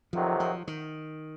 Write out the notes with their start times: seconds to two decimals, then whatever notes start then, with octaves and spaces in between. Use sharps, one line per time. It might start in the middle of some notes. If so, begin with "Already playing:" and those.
0.13 F2 C3 D#3 F3 F#3
0.40 F3
0.68 D#3